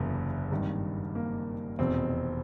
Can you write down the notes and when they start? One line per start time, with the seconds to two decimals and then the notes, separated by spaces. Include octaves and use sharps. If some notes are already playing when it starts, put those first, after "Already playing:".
Already playing: F#1 E2 C3 A#3 B3
0.51 G#1 G2 D#3
1.15 A#3
1.79 F1 E2 B2 C4